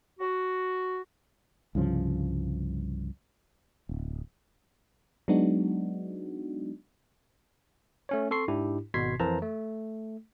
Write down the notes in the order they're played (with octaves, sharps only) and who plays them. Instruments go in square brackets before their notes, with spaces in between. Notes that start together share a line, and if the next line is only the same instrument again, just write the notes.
[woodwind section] F#4
[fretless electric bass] C2 G2 C#3 F3
D1
[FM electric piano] F#3 G#3 B3 D4 D#4 F#4
[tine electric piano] A3 C#4 C#5
C4 A4 C6 C#6 C7
G#2 D4 E4 G4
G#1 B2 C6 G#6 B6 C7
F2 E3 A#4 C5 A5 A#5
A3